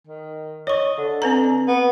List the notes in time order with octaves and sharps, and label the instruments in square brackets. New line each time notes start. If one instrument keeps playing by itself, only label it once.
[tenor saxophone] D#3
[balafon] C#5 C#6 [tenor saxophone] D#5
[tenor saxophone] D3
[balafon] C4 B4 A#5
[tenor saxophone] B3